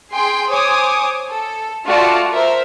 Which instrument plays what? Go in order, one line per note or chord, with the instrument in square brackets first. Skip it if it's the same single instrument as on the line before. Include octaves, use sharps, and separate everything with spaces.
[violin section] G#4 G5 C6
C5 C#5 G#5 D6 D#6
A4
A3 F4 F#4 D5 A5
A#4 C5 E5